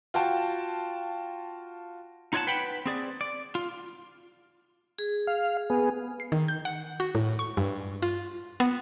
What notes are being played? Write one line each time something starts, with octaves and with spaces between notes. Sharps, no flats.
F4 F#4 G5 A5
D#4 F4 C#5 D5 F#5 A5
B4 F#5 G5 B5
C4 G#4 D5
D5
F4
G#4
F5
B3 G#4
C7
D#3
G6
F#5
F#4
A2
C#6
G2
F4
B3